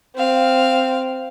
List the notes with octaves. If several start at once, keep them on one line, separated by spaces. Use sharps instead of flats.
C4 F5